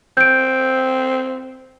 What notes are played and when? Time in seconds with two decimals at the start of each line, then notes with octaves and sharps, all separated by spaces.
0.17 C4 G6 D7